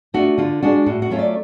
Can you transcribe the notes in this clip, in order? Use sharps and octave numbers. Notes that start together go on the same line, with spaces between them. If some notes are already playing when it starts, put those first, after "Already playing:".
A3 D4 F4 F#4
D3 F4
G#3 D4 F4 F#4
A2 F#4
F#4
F#3 A3 C#4 F4
D5